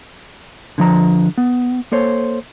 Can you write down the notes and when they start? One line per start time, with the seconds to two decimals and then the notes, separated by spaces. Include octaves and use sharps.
0.78 D3 F3 A#5
1.38 B3
1.92 A#3 A4 C5 C#5